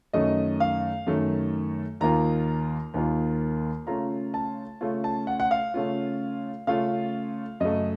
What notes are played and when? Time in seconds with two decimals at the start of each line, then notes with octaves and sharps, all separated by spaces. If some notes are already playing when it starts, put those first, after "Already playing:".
0.13 F#2 D#3 A3 C#4 D#5
0.60 F5
1.07 F#2 D#3 A3 C#4
2.01 D#2 D#3 A#3 F4 A#5
2.94 D#2 D#3 A#3 F4
3.87 C#3 A3 C#4 F4 A#5
4.34 A5
4.81 C#3 A3 C#4 F4
5.04 A5
5.27 F#5
5.40 F#5
5.51 F5
5.74 C#3 A3 C#4 F4
6.67 C#3 A3 C#4 F4 F5
7.60 F#2 C#3 A3 D#5